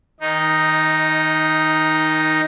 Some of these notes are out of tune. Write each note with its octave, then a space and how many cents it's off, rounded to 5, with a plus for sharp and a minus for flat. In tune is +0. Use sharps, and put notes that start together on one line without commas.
D#3 +20 D#4 +0